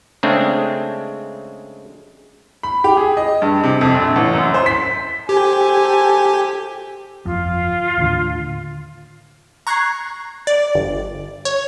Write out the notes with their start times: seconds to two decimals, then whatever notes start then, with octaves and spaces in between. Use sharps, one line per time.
0.23 C#3 G#3 A3 C4 D4
2.63 B5
2.84 G4
2.97 G#4
3.17 D#5
3.42 G2
3.64 C3
3.81 F2
3.95 A#1
4.16 A1
4.33 F#2
4.54 C5
4.66 B6
5.29 G4 A4 C5 G#5
7.25 G1 F2 F4
7.98 D#2 A2 D3
9.67 A#5 C#6 F#6 G#6 C7
10.47 D5
10.75 G1
11.45 C#5